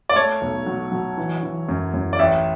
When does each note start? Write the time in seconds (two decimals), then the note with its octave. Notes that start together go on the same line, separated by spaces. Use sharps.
0.09 D5
0.16 A3 C#5
0.41 B1
0.66 F#3
0.92 F#3
1.18 E3
1.43 E3
1.69 F#2
1.94 F#2
2.13 D5
2.19 A1 E5